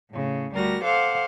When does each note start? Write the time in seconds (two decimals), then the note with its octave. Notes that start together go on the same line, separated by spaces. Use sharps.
0.11 A2 C#3
0.52 D2 G3 F#4 A#4 A#6
0.83 A4 C5 F5 F#5 D6